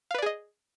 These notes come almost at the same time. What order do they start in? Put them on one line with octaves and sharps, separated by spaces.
F5 B4 D5 G#4 D#5